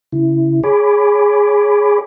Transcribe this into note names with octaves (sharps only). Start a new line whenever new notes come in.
C#3 E4
G#4 C#5 G#5 B5 D6